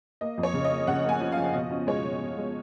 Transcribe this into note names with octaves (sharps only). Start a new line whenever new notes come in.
A#3 D#5
F2
C#5
C#3
D#5
A#3
C#3 F#5
A#3 G#5
F3
F3 F5
B2 D#5
C#4
G#3 C#5
G#3
B2
G#3